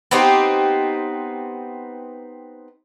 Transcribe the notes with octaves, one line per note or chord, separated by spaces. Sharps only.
B3 C4 D#4 G4